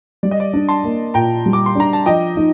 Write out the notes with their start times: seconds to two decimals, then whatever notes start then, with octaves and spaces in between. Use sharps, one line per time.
0.23 G3 D5
0.31 D#5
0.40 D5
0.53 D4
0.69 A5 C6
0.85 A#3
1.14 A#2 G5 A#5
1.46 G3
1.53 D6
1.66 C6
1.75 D4 A#5
1.93 A5
2.06 F3 D#5 G5
2.37 D#4